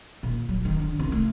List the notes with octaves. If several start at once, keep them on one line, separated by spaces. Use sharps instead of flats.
A#2
F#3
D#3
D3
C2
A3